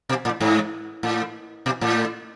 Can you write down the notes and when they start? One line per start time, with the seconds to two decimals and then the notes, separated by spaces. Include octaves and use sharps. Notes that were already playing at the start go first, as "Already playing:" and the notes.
0.09 B2
0.25 A2
0.40 G#2
1.03 A2
1.66 B2
1.81 A2